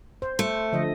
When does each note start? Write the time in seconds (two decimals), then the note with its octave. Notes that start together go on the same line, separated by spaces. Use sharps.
0.22 C5
0.39 A3
0.73 D3 F3 D#5